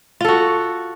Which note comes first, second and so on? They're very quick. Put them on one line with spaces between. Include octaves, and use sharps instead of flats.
F4 A4 F#4